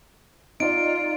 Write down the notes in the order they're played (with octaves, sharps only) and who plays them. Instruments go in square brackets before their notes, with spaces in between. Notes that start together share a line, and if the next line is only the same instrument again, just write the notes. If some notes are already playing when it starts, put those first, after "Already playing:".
[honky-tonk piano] D#4 D5 [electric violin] F4 [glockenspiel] D7